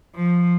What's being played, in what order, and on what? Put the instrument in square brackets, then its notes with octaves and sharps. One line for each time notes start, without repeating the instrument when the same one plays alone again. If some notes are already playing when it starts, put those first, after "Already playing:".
[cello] F3